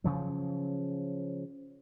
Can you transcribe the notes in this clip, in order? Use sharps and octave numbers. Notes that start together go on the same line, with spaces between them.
C#3 F3 F#3